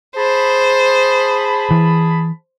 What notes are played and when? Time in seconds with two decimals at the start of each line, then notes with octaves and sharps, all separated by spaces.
0.16 G#4 C5 A5 B5
1.71 E3